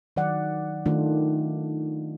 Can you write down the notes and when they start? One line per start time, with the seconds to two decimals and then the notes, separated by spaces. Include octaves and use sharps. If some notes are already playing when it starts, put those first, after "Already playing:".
0.16 D#3 F#3 D5 F#5
0.86 D#3 A3 D4 D#4 F4